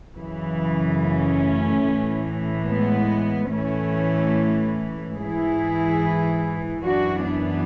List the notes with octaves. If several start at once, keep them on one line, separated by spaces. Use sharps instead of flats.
F#2 C#3 E3
A3 C#4
A2 E3
G#3 B3
A2 E3 A3 C#4
G#2 E3 E4 G#4
F#2 E3 D4 F#4
B3 D4